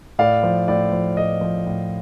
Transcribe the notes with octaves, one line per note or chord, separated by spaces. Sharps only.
A2 D5 F5
F3
A2 D5
F3
A2 D#5
F3
A2